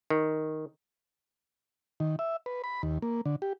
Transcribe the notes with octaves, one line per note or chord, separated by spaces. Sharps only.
D#3
D#3
E5
B4
B5
D#2
A#3
D3
G4